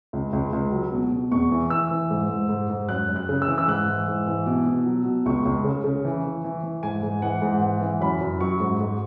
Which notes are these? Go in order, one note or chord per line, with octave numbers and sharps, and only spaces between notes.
C#2
C#2
C#2
F#3
B2
B2
E2 C#6
E3
E3 E6
E3
G#2
G#2
G#2
G#2
F#2 F#6
F#2
F#6
C#3
E6
E3
E6
G#2 F#6
E3
G#2
E3
B2
B2
F#3
B2
C#2 C#6
C#2
C#3
C#3
E3
E3
E3
E3
G#2 G#5
G#2
E3 F#5
G#2
E3 F#5
E3
F#2 B5
F#2
F#3 C#6
G#2
G#2